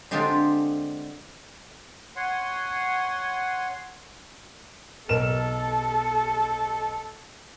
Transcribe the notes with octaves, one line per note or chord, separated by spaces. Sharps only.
D3 G#3 C4 D4 F4 G4
C#5 F#5 G#5 C6
B1 A4 A#4 E7